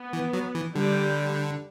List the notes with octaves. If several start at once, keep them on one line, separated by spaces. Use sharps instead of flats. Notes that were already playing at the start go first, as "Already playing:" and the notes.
Already playing: B3
E3
F#3
E3
D3 G3